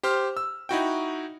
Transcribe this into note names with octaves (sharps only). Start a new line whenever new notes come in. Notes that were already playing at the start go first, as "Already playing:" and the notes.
G4 C5 C6 F6
E6
D#4 E4 F#4 G5